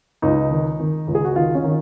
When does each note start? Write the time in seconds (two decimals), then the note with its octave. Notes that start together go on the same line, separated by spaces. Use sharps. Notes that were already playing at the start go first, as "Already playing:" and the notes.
0.22 C#2 D#4
0.51 D#3
0.80 D#3
1.07 C#2
1.15 G#4
1.25 F#4
1.36 D#3 F4
1.54 C#4
1.64 D#3